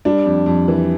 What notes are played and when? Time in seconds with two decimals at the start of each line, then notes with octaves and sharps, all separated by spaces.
0.05 G3 D4
0.26 F2
0.46 F2
0.68 E3